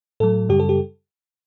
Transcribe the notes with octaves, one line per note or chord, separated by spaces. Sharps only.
A2 F#3 A4
F#2 C#3 G3 G4
A4
G4